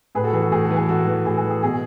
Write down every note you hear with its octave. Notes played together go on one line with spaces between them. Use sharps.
A2 G#4 B4
F#4 A4
E3 G#4
F#4 A4
A2 G#4
E3 A4
G#4
A2 F#4 A4
E3
A2 G#4
G#4
E3
G#4
B2 G#4